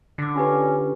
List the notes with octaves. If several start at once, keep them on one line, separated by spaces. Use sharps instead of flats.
D3 D6 A#6
C#4 F4 G4 B4